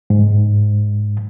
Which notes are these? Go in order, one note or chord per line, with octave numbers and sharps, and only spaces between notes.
G#2